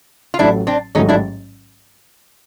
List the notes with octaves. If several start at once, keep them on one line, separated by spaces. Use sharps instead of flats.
F4
A1 A2 F#3 D4 E4
C4 D4
A1 G#2 D#3 F#3 A3 C#4 D#4
D4 E4